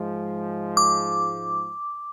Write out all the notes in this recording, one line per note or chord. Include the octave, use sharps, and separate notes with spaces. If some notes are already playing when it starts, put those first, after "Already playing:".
Already playing: G#2 F3 G#3
D6